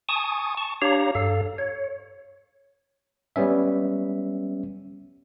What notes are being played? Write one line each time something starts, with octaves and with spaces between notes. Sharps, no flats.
G#5 A5 C#6 D#6
A5 C#6
D4 G4 C#5 F5 A#5
G2 A4 F5
C#5
G3 B3 C#4 E5